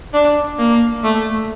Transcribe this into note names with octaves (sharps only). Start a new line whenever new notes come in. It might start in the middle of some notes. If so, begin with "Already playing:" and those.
D4
A#3
A3